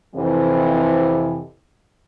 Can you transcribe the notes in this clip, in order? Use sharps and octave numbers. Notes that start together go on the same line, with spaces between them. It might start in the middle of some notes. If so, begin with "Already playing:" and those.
F2 C3 E3